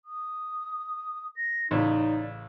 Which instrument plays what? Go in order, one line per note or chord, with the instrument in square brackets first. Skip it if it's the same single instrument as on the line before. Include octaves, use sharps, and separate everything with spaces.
[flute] D#6
A#6
[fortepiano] A1 C#3 [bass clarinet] D#4 [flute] D5